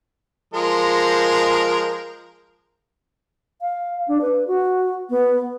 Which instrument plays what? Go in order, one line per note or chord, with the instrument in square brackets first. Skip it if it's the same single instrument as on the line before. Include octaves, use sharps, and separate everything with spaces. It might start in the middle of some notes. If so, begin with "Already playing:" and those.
[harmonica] F3 G#3 A#4
[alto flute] F5
D4
B4
F#4
B3